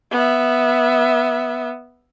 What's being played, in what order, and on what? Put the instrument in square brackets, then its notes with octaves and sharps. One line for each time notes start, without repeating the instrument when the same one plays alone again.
[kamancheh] B3 E5